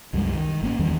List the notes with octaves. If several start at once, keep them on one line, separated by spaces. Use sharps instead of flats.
C2 F#2 G3 G#3
D#3
G#1 A#3 C#4
E2 D#3 E3 G3